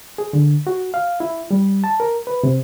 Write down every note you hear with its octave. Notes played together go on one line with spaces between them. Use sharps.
G#4
D3
F#4
F5
E4
G3
A5
A#4
B4
C3